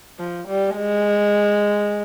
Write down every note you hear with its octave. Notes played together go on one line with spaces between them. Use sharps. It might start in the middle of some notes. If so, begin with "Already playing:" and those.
F3
G3
G#3